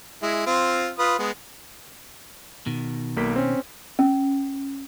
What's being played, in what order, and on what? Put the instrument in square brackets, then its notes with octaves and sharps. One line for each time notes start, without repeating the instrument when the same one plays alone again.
[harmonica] G#3 E4
C4 F4
F4 B4 D#6
G#3 B3
[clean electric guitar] B2 D#3
[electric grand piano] B1 A#3 B6
C4 C#4
[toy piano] C#4